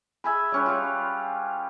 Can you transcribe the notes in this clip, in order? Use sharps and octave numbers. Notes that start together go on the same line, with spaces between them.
G#4 E5 G#5 B5
G3 C#4 B4
G3 F4